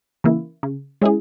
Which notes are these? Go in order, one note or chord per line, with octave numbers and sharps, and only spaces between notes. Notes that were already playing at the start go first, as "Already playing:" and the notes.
C#3 E3 A#3 E4
C#3
G#3 C#4 E4 G#4